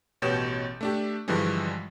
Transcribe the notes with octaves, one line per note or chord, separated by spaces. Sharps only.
A1 B2 G4 C#5 G6 E7
A3 D4 G4
G2 D3 E3 F3 G3 G#3